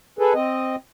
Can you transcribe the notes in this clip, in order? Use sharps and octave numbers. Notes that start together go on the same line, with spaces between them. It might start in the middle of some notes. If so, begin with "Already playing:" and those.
G#4 A4 B4
C4 D#5